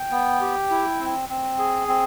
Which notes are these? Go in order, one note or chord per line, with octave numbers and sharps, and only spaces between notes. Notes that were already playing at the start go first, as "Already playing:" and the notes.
Already playing: G5
B3
G4
E4
C4
C4
G#4
C4